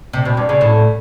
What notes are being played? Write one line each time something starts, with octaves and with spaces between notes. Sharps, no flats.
C3
B2
G2
C#3
A2